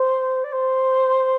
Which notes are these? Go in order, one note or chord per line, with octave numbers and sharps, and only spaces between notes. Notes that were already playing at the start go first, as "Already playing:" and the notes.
Already playing: C5
D5
C5